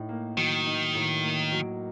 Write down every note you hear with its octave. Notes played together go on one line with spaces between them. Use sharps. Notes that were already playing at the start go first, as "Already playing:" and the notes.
Already playing: A2 D#4
A#3
D#3 F#3
D#4
A2
A#3
F#3